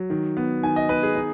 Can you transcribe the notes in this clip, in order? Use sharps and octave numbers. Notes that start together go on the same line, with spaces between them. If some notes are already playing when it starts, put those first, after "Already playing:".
Already playing: F#3
D#3
B3
D#3 G#5
D#5
B3 B4
G#4
D#4